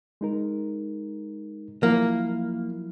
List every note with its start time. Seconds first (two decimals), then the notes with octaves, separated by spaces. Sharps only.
0.21 G#3 D#4 A#4
1.83 F3 F#3 A#3 E4